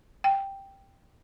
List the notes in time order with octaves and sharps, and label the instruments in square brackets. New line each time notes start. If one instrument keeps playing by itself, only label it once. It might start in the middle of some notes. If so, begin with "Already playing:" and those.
[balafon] G5